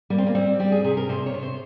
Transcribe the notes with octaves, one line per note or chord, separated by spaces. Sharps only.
G3 A#3
C4
A#3
G3 C4
G3 G4
G#4
C3 G#4
A#4
C3 C5
C#5
C3
C5